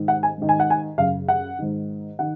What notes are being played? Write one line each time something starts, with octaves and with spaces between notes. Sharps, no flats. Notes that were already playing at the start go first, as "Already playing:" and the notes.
Already playing: G#2 D#3
F#5
G#5
G#2 D#3
G#5
F#5
G#5
F#2 C#3 F5
F#5
G#2 D#3
D#3 F#5